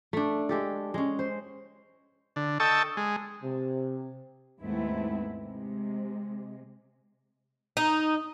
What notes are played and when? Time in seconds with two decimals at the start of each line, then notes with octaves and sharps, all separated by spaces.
0.13 A3 D4
0.49 G#3 G4 A4
0.94 G#3 C#4
1.19 C5
2.36 D3
2.60 A4 D#5 G5 A5 C#6 E6
2.97 G#3
3.43 C3
4.61 D#2 G#2 A3 B3 C4 E4
5.40 C3 G#3
7.77 D#4